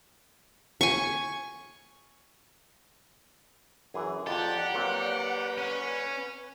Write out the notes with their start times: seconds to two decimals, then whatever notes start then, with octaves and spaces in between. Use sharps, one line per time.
0.81 G#5 C#6
3.94 F#2 E3 G#4
4.27 F2 G4 D5 F#5 A5 A#5
4.73 F#3 A#3 C4 B4
5.58 C#4